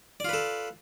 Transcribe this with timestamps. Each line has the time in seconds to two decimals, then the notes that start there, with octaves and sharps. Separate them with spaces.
0.20 D5
0.25 F4
0.29 B4
0.33 A4